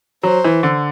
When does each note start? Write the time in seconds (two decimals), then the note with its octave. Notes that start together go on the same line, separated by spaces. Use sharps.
0.23 F#3 C5
0.44 E3
0.63 D3